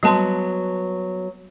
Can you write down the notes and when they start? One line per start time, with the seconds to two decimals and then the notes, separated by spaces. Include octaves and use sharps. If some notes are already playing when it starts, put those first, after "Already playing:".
0.03 F#3 G3 B3 A5 C6